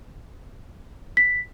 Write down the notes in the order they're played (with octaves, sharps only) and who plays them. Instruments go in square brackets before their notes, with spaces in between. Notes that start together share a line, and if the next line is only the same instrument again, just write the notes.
[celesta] B6